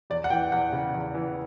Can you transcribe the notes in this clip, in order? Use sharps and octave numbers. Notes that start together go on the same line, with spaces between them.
E2 D5
F#5
E3 G5
E2 F#5
C#3
E2
E3